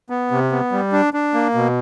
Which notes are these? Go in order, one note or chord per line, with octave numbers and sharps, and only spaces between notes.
B3
C3
B3
G3
D4
D4
A#3
B2